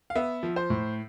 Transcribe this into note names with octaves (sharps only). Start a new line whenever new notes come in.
F5
B3 E5
F3
C5
A2